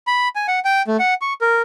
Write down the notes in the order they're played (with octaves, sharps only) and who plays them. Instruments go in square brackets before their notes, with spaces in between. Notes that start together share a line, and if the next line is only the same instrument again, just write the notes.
[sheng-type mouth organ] B5
G#5
F#5
G5
A3
F#5
C#6
A#4